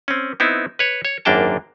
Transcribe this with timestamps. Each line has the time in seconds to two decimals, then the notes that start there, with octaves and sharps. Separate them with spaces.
0.08 C4 C#4
0.40 B3 C4 D#4 E4
0.79 B4 C#5
1.05 C#5
1.25 G#1 F#2 A#3 D4 G5 A5